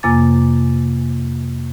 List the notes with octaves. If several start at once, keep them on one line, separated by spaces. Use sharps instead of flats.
F2 C3 A#3 G#5 D6 A6